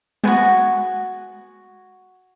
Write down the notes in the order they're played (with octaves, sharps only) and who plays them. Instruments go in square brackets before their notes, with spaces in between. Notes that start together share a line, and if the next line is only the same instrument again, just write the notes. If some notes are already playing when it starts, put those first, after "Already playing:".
[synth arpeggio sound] G#3 B3 [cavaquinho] F#4 G#5